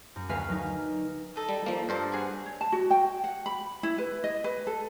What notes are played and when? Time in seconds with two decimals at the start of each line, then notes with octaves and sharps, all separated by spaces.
0.16 F#2
0.29 D2 A#3 B4 F5 G#5 B6
0.49 F#3 D#4
1.36 D#4 A4
1.49 G3
1.66 F3 A#3
1.89 G2 C5 A5
2.12 F#4 G#4
2.46 C#5
2.61 A5
2.72 F#4
2.91 G5
3.24 F#5
3.46 B5
3.83 E4
3.98 B4
4.24 D#5
4.44 B4
4.67 A4